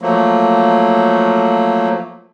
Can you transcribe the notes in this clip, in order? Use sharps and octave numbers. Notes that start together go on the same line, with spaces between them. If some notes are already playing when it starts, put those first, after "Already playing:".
F3 F#3 A3 A#3